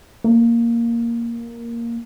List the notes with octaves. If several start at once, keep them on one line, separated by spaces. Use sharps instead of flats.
A#3